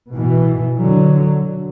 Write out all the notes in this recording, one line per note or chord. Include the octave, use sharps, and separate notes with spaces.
B2 E3
D3 F#3